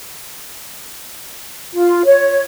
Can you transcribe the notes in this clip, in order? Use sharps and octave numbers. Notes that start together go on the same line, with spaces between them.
F4
C#5